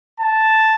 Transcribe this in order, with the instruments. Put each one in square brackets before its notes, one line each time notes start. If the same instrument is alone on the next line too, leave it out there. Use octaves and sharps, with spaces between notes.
[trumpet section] A5